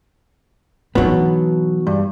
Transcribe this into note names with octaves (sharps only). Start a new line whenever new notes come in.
B2 E3 F#3 B3 D#4
G2